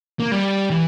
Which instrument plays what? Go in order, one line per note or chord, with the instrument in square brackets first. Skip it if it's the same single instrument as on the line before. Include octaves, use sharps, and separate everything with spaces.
[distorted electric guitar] A#3
G3
E3